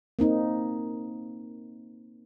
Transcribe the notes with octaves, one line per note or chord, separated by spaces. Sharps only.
A#3 C4 D#4